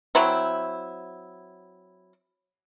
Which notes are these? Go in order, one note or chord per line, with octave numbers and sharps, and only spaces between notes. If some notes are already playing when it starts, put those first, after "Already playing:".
F#3 C4 E4